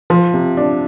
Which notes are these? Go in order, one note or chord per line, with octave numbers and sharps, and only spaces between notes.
F3
C3
D4